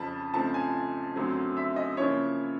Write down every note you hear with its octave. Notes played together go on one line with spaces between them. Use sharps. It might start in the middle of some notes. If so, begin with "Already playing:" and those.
Already playing: F2 C#3 F3 A5 B5
C#2 C#3 F3 A3 C4 A5
G#5
F#2 D3 F#3 A3 C4
E5
D#5
C#3 F3 A#3 C#4 E4 C#5